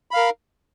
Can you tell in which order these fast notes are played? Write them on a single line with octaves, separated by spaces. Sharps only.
B5 F5 A#4